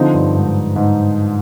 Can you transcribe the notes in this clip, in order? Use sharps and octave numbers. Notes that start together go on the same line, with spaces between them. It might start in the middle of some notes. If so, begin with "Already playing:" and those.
Already playing: D3 F3 C4 D#4
G2
G#2
G#2